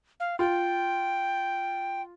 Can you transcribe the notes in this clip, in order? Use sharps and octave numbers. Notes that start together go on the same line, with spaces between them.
F5
F4 G5